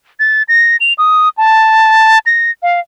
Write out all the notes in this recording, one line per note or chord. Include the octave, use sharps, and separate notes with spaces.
A6
A#6
F7
D#6
A5
A#6
F5